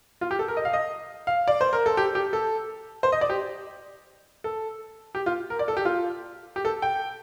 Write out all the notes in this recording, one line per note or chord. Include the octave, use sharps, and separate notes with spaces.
F4
G4
A4
A#4
D#5
F5
D#5
F5
D5
C5
A#4
A4
G4
G4
A4
C5
D#5
D5
G4
A4
G4
F4
A#4
D5
A4
G4
F4
G4
A4
G5